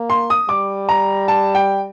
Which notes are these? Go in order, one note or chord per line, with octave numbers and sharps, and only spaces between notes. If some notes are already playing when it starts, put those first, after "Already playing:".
Already playing: A#3
C6
D#6
G3 D6
A#5
A5
G5